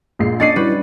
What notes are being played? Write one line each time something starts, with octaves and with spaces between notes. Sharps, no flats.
A#1 G#3 C7
C#4 D4 D#5 A6 C7 C#7 D#7
G3 E4 F#4 B4